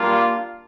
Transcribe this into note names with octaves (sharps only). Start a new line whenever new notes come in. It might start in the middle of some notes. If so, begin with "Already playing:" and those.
Already playing: G3 A#3 D4 F4